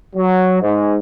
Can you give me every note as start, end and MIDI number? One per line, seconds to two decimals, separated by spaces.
0.16 0.59 54
0.62 0.97 44